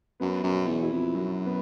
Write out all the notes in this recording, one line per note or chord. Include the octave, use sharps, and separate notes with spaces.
F#2 B3
F#2
B2
E2
E4
F2
F#2 F#3
B3